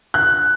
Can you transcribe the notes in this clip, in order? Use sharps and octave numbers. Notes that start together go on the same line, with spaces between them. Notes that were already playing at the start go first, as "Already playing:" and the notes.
F#6